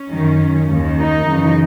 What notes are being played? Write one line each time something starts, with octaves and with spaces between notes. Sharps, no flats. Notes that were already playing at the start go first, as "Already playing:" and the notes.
Already playing: C#4
F#2 D#3
D#2 D#3
D#4
F#2 C#3 E3